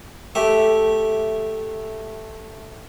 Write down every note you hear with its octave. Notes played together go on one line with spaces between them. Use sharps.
A3 G4 E5